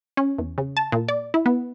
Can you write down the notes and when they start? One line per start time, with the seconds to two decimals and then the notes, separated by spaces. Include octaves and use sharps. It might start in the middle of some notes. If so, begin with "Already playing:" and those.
0.17 C#4
0.38 E2
0.58 C#3
0.77 A5
0.92 A#2
1.08 D5
1.34 E4
1.46 B3